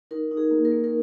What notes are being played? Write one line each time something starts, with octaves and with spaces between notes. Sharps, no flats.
D#4 A#4
D#4
G#4
A#3
A#4
A#3
A#4